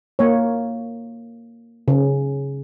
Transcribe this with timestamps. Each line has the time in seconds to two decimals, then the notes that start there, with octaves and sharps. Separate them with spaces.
0.19 A#3 C#5
1.88 C#3